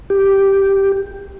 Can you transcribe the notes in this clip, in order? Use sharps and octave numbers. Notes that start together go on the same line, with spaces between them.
G4